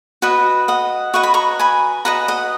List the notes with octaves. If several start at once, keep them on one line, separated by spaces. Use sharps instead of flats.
F#4 B4 D#5
D#5 F#5
F#4 B4 D#5 C#6
B5
A#5 C#6
G#5 B5
F#4 B4 D#5 F#5 A#5
D#5 F#5